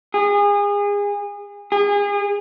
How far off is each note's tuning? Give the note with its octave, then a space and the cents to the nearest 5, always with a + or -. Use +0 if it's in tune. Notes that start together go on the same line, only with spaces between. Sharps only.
G#4 -30
G#4 -35